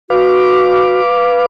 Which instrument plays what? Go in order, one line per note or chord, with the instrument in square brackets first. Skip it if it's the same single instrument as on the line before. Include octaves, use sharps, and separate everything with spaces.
[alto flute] F#4 [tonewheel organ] B4 F5 D6